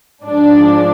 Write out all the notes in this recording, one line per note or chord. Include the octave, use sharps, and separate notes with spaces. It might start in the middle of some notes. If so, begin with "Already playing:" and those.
G#2 F3 G#3 D4 D5